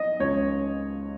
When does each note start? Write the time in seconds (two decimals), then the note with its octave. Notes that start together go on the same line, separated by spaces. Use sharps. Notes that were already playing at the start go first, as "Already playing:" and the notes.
Already playing: D#5
0.20 C#2 C#5